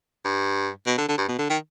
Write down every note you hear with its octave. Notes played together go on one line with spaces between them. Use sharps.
G2
B2
D3
D3
G2
B2
D3
D#3